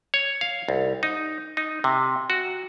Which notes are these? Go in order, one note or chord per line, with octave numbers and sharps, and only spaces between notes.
C#5
F5
C2
D#4
D#4
C3
F#4